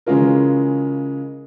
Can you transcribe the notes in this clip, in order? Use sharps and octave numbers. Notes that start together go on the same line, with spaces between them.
C#3 E3 G#3 C#4 F4 A#4